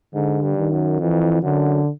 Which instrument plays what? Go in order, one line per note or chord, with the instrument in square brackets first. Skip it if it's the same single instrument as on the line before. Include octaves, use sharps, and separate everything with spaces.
[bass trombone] G#2 [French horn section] D3
[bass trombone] G2
[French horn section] D#3
[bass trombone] F#2
[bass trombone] F2 [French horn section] E3
[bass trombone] F#2 [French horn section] D3